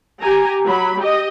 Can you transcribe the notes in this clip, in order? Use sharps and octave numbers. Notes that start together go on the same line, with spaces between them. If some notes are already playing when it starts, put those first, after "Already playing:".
G4 G#5 A#5
F#3 B5
G4 D#5